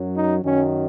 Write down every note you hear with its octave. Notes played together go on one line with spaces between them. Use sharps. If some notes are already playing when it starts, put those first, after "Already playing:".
Already playing: F#2 F#3
D#4
F#2 D#3 F#3 C#4